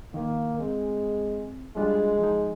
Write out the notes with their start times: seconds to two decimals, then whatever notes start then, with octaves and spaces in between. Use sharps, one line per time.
0.14 D#3 A#3
0.59 G#3 C4
1.76 G3 G#3 D4 F4
2.19 F3 D#4